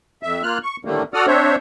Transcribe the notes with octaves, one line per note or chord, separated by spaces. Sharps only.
F2 E5
A#3 F4 F6 F#6
C#6
A2 D3 D#3 G3 A3 A#3
F#4 A4 D5 F#5 D#6 F6
C4 D4 C5 C#5 E5